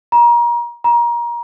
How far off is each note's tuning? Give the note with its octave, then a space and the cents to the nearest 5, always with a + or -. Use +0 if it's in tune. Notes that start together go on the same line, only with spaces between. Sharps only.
A#5 +30
A#5 +25